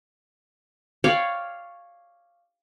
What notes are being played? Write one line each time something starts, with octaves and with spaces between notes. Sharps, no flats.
C#5 D5 F5 G5